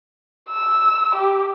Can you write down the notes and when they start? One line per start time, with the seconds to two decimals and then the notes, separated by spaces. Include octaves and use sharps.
0.51 E6
1.15 G4